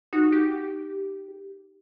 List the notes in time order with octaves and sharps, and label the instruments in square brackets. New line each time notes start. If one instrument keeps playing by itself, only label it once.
[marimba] D#4 [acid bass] F#4
[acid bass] G4